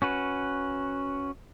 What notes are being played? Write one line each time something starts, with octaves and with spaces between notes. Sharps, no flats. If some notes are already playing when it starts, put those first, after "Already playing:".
C#4 F#4 B4